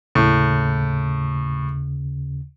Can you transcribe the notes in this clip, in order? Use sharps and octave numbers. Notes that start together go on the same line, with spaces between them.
D#2 A2 C#3